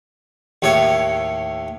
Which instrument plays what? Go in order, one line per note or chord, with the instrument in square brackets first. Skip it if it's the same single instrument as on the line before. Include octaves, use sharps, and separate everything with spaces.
[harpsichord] D#2 A2 C#5